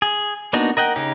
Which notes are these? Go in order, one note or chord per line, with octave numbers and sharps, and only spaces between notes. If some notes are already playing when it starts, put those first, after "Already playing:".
G#4
A#3 B3 D4 D#4 F#4
A#4 D#5 F#5 G5
C#3 C#4 D#4 G4